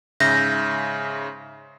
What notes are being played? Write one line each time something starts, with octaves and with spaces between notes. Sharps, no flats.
G#2 C#3 E5 G6 A#6